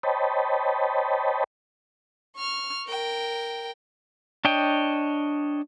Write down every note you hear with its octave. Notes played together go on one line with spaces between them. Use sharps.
C5 C#5 D#5 G5 A5 B5
C#6 F6
A#4 G5
D4 C#5 D#5 G5